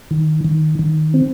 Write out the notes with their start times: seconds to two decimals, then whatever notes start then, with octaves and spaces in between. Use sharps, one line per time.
0.11 D#3
0.45 D#3
0.79 D#3
1.14 C4